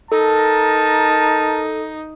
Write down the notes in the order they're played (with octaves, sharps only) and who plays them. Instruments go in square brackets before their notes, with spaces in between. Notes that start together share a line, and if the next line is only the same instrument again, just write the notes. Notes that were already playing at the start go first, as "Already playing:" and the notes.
[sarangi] D#4 [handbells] A4 [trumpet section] A#4 A5